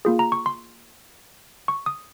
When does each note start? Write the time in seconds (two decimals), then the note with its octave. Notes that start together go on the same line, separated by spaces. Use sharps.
0.05 A#3 F4 G#4
0.19 A#5
0.32 C#6
0.46 C6
1.68 C#6
1.86 D#6